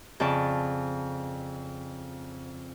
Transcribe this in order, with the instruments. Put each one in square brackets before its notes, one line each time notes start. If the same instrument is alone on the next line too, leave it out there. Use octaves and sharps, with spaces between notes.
[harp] F2 C#3 D5 A5 C#6